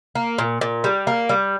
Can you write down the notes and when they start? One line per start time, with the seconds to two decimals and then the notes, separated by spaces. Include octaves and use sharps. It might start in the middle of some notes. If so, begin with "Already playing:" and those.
0.15 A#3
0.38 A#2
0.61 A#2
0.84 G3
1.07 A#3
1.29 G3